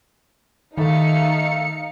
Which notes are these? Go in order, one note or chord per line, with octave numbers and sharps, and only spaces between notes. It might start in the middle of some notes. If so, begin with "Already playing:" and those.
D#3 A3 D#4 A4 F5 C#7